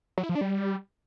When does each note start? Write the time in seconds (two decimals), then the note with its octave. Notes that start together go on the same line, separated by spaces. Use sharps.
0.18 F#3
0.23 E4
0.29 F3
0.35 D4
0.41 G3